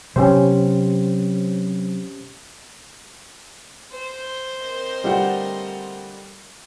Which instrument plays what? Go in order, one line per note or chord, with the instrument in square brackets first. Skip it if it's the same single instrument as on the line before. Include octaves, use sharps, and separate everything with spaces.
[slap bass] C3 F#3 B3 [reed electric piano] C#4 G4 C5
[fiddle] C5
[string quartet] C4 A#4 D#5
[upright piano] D3 A3 F4 [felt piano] G3 F#5